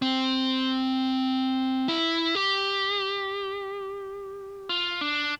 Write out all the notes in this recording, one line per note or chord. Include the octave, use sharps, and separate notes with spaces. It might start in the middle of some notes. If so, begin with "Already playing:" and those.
C4
E4
G4
F4
D4